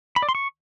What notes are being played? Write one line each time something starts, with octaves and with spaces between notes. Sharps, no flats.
B5
D5
C6
C#6